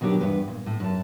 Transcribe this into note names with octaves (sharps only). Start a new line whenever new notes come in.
B2 D#3 F#3 D4 G4
E2 G2 B4
A#2
A2
F#2 A5